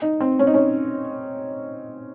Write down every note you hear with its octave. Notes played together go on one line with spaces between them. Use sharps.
D#4
C4
C#4
D#4
C#4